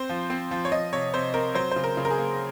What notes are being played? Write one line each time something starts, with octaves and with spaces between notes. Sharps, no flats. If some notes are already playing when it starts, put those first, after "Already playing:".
Already playing: C4 C5
F3
C4
F3
C#5
F3 D#5
C3 C#5
C3 C5
C4 A#4
F#3 C5
C#3 C5
A#4
C#3
A#4
G#4
A#3